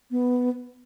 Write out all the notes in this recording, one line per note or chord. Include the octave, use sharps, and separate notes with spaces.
B3